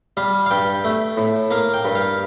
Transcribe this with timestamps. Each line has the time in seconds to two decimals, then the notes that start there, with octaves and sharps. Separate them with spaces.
0.17 G3 F5
0.46 F5
0.51 G2 G5
0.84 A3
1.17 A2
1.51 A#3 F5
1.74 G5
1.85 G2
1.95 F5